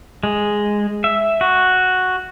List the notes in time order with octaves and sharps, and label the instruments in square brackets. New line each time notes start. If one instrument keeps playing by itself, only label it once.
[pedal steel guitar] G#3
E5
F#4